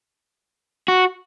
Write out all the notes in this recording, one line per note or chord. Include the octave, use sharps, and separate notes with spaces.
F#4